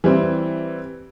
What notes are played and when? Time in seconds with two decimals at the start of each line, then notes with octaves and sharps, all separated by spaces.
0.04 E3 G3 C4 E4